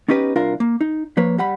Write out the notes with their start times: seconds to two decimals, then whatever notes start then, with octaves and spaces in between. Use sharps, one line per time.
0.08 B3 C#4 D#4 G4 B4
0.36 C2 D4 F4 A#4 F5
0.60 A#3
0.81 D#4
1.17 F3 A#3 B4 C#5
1.38 G3 F#5 B5